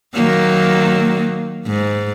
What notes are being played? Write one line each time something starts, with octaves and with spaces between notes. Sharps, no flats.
D#3 F#3 A#3
G#2